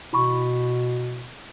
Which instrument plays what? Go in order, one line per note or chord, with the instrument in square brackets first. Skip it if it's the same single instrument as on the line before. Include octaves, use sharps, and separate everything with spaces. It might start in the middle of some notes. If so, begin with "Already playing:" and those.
[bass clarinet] B2 [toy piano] E4 B5 C#6